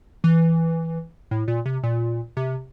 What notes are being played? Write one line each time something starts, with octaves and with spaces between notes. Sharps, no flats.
E3
A2
A#2
C3
A#2
C3